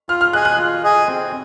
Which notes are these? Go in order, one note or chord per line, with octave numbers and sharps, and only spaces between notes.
F4 F6
F6
G#4 D#5 G#5 F#6
F#6
F4
G#4 D#5 G#5
C4